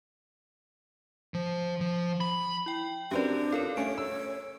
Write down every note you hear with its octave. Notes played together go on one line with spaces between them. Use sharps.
F3
F3
B5
E4 G5
F#2 C4 D4 G4 A#4 B4 D5
F4 A4 A#4 C#5
A3 C#4 C#5 D7
E6